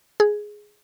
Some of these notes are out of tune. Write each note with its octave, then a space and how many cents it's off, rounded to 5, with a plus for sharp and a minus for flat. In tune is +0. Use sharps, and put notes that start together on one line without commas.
G#4 +5